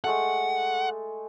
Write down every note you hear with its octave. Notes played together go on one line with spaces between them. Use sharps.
G#3 A3 A4 F#5